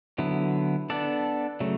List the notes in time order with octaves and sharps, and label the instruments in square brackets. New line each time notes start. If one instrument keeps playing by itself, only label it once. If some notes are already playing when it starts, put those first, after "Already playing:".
[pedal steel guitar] D3 F#3 B3 E4
B3 D4 A4 D5
C#3 F#3 A3